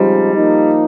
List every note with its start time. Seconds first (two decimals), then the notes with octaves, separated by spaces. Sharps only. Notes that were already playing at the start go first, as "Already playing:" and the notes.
Already playing: C#3 F3 G3 G#3 C4 D#4
0.35 F3 A#3 D#4